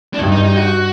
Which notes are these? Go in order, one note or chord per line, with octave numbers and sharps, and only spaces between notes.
D4
G2 D#4
D#4
D#4
F#4